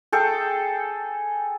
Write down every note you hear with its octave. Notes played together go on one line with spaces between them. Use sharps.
G#4 A4 G5